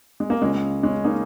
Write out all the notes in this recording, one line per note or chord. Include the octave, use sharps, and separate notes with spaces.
G#3
A#3
C#2 C#3 G#3 C#4
G#3 C#4
A#3 D#4